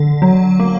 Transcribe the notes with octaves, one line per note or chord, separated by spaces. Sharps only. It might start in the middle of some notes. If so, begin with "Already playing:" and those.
Already playing: D3
F#3
A#3